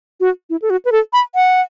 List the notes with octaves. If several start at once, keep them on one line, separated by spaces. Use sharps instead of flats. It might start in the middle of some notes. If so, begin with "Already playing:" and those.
F#4
E4
A4
F#4
B4
A4
B5
F#5